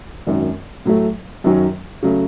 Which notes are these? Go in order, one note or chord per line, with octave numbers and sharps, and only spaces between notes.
G#1 F#2 D#3
A2 F#3 A3
F#2 D#3 F#3 C#4
C#3 F#3 A3